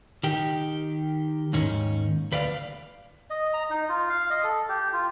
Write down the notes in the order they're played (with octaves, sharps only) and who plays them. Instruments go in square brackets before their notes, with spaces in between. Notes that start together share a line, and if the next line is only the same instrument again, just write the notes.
[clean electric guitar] D#3 G4
D#2 G#2 D#3 C#4
D2 B4 D5 E5 F5
[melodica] D#5
A#5
D#4
F4
F5
D#5
A4
G4
F4